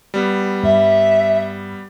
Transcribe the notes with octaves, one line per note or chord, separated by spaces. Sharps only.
G3 B3
G2 E5